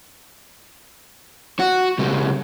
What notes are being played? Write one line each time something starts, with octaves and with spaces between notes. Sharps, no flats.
F#4
C#2 G3